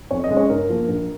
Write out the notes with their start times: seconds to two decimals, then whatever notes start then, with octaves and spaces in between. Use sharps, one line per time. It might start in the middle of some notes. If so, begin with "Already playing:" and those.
0.11 F2 C#5
0.24 D#5
0.30 C#3 G#3
0.37 C#5
0.50 G2 A#4
0.69 F3 A#3
0.88 A#1